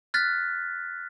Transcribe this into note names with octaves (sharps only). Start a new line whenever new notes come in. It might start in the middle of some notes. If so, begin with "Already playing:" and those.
F6 F#6 A6 B6